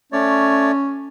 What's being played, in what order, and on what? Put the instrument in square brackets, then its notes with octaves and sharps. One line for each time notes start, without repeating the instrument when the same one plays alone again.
[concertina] A3 C#5 D5 [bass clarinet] C#4